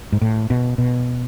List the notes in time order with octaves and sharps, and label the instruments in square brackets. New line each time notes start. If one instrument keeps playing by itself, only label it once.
[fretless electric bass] G#2
A2
B2
B2